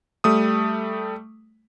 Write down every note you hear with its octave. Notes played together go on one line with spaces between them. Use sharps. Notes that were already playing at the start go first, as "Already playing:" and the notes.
G3 A3 D#6